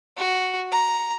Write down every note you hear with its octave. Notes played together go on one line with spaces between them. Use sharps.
F#4
A#5